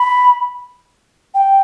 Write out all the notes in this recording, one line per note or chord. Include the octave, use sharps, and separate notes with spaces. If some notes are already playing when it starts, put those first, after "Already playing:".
Already playing: B5
G5